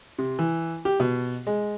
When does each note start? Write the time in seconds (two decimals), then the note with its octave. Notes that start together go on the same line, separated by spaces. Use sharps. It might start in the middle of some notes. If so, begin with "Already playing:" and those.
0.19 C3
0.39 E3
0.85 G4
1.00 B2
1.47 G#3